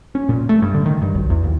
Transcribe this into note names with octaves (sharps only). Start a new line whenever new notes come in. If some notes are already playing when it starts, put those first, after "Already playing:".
C#4
A#2
A3
G2
D3
D#3
G2
B1
E2
D#2